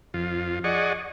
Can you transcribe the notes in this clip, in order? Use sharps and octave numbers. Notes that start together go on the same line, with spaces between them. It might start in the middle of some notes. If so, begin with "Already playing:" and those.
F2 F4
G#4 D5 D#5 F#5 C#6